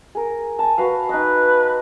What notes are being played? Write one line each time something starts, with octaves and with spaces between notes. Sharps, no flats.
G#4 A#4
G#5 A5
F#4 B4 F5
D#4 B4 D#5